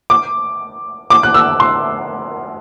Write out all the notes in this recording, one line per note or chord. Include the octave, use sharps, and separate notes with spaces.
D6
D6
F#6
E6
C6